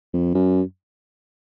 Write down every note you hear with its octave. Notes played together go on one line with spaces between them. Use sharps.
F2
F#2